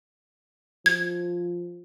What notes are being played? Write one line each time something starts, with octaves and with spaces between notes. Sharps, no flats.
F3 G#6